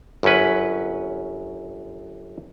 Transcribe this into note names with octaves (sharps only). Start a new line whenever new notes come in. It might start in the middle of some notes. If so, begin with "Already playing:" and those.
G1 F#2 F#3 C#4 B4